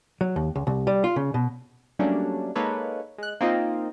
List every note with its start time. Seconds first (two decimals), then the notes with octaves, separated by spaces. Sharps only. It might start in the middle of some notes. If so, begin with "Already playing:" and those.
0.21 F#3
0.36 D#2
0.55 C#2
0.67 C2
0.87 G3
1.04 F4
1.16 C#3
1.34 B2
1.99 F#3 G3 A3 A#3 C#4 D4
2.55 G#3 A#3 D#4 A4 B4 C#5
3.18 G#3 F#6
3.41 A#3 C4 D#4 F4 D#5